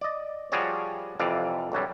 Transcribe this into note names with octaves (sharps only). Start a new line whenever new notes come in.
D5 D#5
F3 G3 F#4 G#4 C#5 D5
F2 C3 E3 D5 F5
B1 F#2 F#3 G3